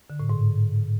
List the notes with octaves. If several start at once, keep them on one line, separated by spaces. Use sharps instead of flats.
D3
A2
G#2